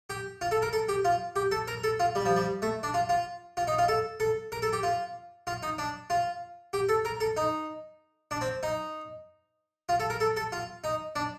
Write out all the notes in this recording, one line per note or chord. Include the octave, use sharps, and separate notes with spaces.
G4
F4
A4
A#4
A4
G4
F4
G4
A4
A#4
A4
F4
G3
F3
G3
A3
D4
F4
F4
F4
D#4
F4
A4
A4
A#4
A4
G4
F4
F4
D#4
D4
F4
G4
A4
A#4
A4
D#4
D4
C4
D#4
F4
A4
A#4
A4
A4
F4
D#4
D4